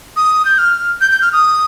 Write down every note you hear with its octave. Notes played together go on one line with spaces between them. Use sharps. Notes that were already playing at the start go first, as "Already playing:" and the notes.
D#6
G6
F6
G6
G6
F6
D#6